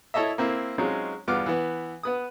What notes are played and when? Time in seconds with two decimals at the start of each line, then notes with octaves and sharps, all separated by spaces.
0.14 E4 A4 C#5 D#5 E5
0.38 A#3 C4 E4
0.78 F#3 G#3 C4 C#4 D#4 F4
1.28 E2 G2 B3 F4 D6 F6
1.46 E3 B3
2.03 B3 B4 D#6